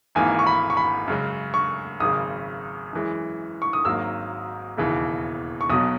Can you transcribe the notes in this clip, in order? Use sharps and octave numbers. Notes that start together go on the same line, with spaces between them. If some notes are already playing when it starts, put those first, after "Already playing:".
G#1 G#2 E3 A#3 G#5
C#6
B5
C#6
B5
F#2 C#3 G#3
C#6
G#1 F#2 C#3 D#6
F#2 E3 G#3
C#6
D#6
G#1 G#2 F#3 A#3 E6
E1 D#2 C#3 E3
C#6
B1 B2 F#3 D#6